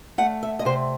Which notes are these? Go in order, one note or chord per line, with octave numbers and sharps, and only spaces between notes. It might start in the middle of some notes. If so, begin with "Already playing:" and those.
A3 F#5
E5
D#5
C3 C5